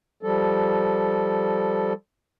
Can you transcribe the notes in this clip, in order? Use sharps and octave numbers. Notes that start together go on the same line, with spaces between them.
F3 G3 A4